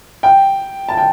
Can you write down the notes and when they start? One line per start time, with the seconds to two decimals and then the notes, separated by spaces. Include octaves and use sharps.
0.23 G5
0.89 A5
0.97 G5